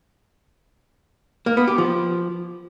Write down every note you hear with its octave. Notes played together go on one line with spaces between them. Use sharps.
A#3
B3
G4
F3